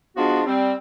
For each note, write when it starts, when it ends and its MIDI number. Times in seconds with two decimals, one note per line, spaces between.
0.16 0.42 53
0.16 0.42 56
0.16 0.42 59
0.16 0.42 62
0.16 0.42 65
0.16 0.42 66
0.46 0.73 55
0.46 0.73 60